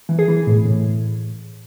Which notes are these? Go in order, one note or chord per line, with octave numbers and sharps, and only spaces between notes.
E3
G#4
E3
A2
A2